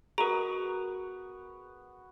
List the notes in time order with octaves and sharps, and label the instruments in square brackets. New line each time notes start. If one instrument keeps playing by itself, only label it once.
[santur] B3 F#4 F#5 [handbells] G#4 A#4 [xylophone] A#5